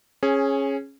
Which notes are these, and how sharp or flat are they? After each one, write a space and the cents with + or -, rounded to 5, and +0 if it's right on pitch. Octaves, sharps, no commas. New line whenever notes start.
C#4 -15 G#4 +5